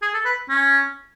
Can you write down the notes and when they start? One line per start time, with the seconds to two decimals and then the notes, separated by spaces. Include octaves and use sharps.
0.02 G#4
0.14 A4
0.25 B4
0.49 C#4